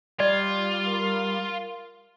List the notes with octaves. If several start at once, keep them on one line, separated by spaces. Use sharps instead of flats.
G3 F4 D5
A#4